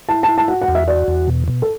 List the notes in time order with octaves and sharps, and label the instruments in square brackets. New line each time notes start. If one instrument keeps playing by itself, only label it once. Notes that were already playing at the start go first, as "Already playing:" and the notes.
[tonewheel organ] E4 [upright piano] A5
[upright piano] A5
[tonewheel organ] E4
[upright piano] A5
[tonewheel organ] F#4 [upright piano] F#5
[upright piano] F#5
[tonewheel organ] E2
[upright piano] E5
[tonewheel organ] F#4 [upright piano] D5
[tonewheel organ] E2
B2
B2
[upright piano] A4